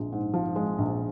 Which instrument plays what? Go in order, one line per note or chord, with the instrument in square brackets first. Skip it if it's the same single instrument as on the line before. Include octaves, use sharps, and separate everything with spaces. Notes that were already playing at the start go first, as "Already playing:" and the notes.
Already playing: [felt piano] A#1 F3 G#3
G#2
F3
G#3
A#1